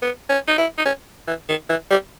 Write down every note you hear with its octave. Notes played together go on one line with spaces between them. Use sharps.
B3
C#4
D#4
E4
D#4
C#4
E3
D#3
E3
G3